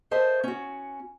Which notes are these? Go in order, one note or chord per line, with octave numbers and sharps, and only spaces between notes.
A4 A#4 C5 D#5 E5 A5
C#4 F#4